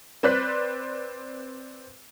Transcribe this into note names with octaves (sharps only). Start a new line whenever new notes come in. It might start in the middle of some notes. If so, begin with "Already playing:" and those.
C4 B4 D5 F#6 B6